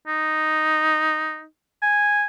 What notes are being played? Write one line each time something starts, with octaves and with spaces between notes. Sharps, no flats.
D#4
G#5